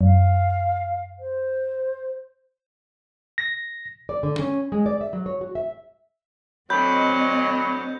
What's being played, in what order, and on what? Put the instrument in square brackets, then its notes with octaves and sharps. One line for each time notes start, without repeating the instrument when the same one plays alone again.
[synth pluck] F#2 [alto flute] F5
[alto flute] C5
[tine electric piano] A#6
[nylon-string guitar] D5
D3
C#4
G#3
D5
E5
F#3
C#5
F#4
E5
[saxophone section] D2 D3 F#3 [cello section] C4 D#5 [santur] B5 [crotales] G6